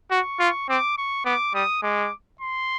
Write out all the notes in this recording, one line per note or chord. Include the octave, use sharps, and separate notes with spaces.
F#4 C#6
F4
C4 D6
C#6
B3 D6
G3 D#6
G#3 D6
C6